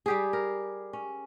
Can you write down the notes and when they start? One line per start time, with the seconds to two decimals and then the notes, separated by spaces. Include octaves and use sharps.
0.06 G3 G4 G#4
0.33 A#4
0.93 C#4